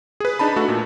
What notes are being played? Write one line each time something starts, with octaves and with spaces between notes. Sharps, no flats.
G#4 B4
D4 D#4 A5 B5
A3 F#4 A4
A#2